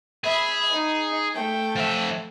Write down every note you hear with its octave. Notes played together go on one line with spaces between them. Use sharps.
G#4 E5 B5
D#4
A3 G5
F3 E5